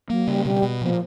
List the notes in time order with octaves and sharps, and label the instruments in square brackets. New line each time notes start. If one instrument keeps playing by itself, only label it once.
[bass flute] F#3 [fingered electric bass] A#3
[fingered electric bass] C#3 [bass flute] G3
[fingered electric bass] B2 [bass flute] G3
[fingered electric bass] B2
[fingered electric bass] A#2 [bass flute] F3